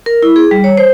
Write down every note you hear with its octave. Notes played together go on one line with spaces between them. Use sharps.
A#4
E4
G#4
G3
C#5
C5